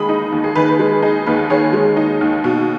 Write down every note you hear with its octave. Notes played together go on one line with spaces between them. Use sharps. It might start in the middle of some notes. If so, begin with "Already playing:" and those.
Already playing: D#2 D#3 G#3 G#5 B5 D#6
D#4
D#2
G#4
D#3 B4
B4
G#3 G#4
D#4 G#4
D#2 B4
D#3 G#4 C#5
G#3
D#4
D#2
B2